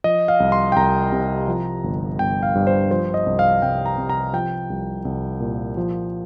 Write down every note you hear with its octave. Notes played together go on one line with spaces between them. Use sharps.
F3 D#5
F5
C2
C6
G5
C2 A#5
C3
F3
G1
G1 G5
F5
G2
C5
F3 C5
D#5
C2
F5
C2 G5
A#5
C3
A#5
F3 G5
C2
C2
A#2
F3